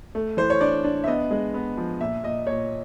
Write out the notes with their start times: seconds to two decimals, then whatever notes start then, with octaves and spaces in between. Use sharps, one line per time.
0.15 A3
0.37 E3 C5
0.50 C#5
0.61 D4 D5
0.84 D4
1.04 E5
1.07 B3 D#5
1.31 G#3
1.54 B3
1.77 F3
2.00 A#2 E5
2.23 A#2 D#5
2.47 A#2 C#5